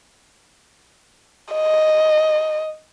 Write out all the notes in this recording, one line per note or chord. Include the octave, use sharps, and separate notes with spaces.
D#5